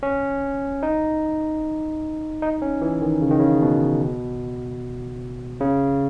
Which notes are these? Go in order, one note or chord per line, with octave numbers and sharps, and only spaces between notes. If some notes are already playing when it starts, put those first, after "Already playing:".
C#4
D#4
D#4
C#4
E3
D#3
C#3
D#3
C#3
B2
C#3